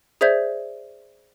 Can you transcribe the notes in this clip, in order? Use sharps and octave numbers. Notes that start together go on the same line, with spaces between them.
G#4 C5 D5 E5 G6 G#6